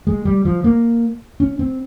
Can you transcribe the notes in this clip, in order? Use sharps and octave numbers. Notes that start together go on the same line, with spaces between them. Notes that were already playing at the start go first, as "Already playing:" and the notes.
G#3
G3
F3
A#3
C#4
C4